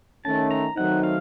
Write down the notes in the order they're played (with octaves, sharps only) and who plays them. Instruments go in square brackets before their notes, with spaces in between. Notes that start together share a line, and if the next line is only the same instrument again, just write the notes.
[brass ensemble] D#3 A3 C#4 [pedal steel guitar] A5
[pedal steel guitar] A#5
[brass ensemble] D#3 F#3 A3 C4 D#4 [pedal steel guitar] F#5
[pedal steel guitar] F5